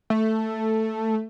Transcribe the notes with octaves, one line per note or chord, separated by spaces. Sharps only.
A3